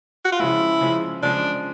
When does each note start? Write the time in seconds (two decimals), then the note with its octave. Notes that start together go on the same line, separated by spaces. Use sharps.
0.25 F#4
0.32 F4
0.40 C#3 F3 G#3 E4
0.81 C#3 F3 G#3
1.23 C#3 F3 G#3 D4